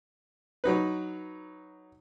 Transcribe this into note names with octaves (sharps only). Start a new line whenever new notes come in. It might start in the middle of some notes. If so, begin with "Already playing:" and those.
F#3 D#4 B4